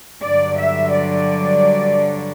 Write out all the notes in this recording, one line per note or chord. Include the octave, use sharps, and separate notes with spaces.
G2 D3 F#3 D5
E5
D5